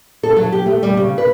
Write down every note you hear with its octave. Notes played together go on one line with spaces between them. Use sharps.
A4
F#3
G4
A3
G3
C#3
B4